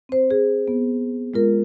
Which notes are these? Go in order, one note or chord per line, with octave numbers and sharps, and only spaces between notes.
C4 C5
G#4
B3
G#3 F4 A#4